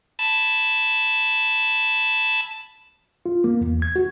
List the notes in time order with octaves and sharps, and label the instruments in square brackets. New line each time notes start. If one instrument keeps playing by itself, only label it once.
[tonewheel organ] A5 B5 E6 G#6 A6
[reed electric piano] F4
A#3
E2
G#6
F#4